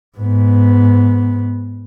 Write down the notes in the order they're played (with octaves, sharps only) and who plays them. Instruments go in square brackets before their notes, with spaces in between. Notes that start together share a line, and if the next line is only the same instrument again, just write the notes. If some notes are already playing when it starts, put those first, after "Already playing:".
[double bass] G#2 B3